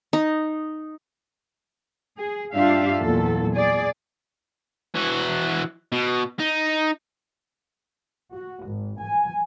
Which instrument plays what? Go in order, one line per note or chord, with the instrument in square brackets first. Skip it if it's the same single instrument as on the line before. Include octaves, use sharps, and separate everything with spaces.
[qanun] D#4
[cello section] G#4
G2 D4 F4 G4 E5 F5
E2 A#2 F#3 A4
G#4 D5
[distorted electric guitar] E3 F#4
B2
D#4
[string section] F#4
G#1
G#5